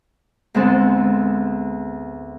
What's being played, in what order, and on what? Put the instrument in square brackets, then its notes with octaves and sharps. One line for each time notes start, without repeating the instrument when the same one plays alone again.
[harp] D2 G#2 G#3 B3 C4 A4